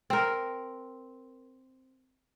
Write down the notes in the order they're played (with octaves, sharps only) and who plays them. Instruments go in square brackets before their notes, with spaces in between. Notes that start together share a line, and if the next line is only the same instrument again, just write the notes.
[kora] C4 A#4